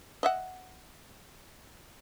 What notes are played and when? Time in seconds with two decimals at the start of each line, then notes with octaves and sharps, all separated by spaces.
0.23 D#5 E5 F#5